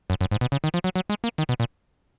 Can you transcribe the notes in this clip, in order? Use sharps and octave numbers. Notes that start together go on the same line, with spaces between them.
F#2
F#2
G#2
B2
C#3
D#3
F3
F#3
F#3
G#3
A#3
D#3
B2
A#2